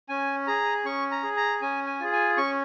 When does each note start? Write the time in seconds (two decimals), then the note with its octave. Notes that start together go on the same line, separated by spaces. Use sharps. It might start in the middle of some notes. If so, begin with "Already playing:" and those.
0.09 C#4 G#5
0.47 G#4 A#5
0.85 C#4 C#6
1.11 A#5
1.23 G#4
1.37 A#5
1.62 C#4 G#5
1.87 G#5
2.00 F4 G#4
2.13 G#5
2.37 C#4 C#6